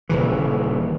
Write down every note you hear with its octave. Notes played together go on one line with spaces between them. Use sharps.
D#1 C#3 E3